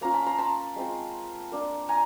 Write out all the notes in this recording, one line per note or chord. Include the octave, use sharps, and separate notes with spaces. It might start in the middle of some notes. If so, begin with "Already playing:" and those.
A#3 C#4 F4 A#5
A5 B5
A#5 C6
A5 B5
G#3 C4 F4
A#3 D4 F4
G#5 A#5